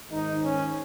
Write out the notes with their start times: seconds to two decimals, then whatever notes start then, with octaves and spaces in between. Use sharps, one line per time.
0.10 G#2 D#3 D#4
0.42 C#4